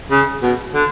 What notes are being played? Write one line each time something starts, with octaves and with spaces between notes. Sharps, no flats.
C#3
B2
D3